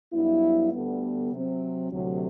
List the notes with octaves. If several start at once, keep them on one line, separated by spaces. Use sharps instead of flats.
G2 F#3 B3 E4
D2 D3 G3 B3
C3 F#3 C4
D2 C3 F#3